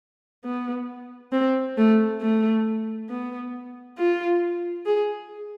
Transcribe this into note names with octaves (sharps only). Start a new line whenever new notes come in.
B3
C4
A3
A3
B3
F4
G#4